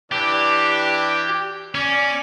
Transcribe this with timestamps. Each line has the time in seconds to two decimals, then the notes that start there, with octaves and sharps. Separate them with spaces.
0.12 E3 D4 G4
1.75 C#4 D5